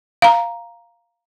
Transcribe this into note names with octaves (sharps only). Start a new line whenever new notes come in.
F5 A#5